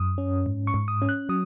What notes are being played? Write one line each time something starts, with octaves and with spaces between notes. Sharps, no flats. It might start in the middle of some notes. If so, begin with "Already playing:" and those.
Already playing: F#2 D#6
C#4
G#2
C#6
G#2
D#6
C#4
F#6
F#3 D#6